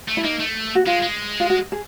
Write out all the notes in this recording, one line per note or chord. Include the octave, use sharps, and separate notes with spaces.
A3
E4
A#3 D#4
A3
F#4
G#3 F4
G#3
F4
F#4
G#4